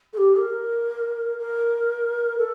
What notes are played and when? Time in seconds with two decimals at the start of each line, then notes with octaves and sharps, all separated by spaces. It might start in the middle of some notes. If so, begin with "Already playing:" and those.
0.13 A4
0.17 G4
0.39 A#4
1.38 A#4
2.38 A4